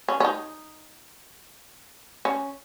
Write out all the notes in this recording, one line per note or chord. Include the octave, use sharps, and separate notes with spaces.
C#4
C#4
D#4
C#4